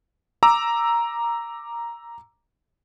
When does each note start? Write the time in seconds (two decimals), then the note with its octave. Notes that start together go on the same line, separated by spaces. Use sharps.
0.43 A#5 D6 E6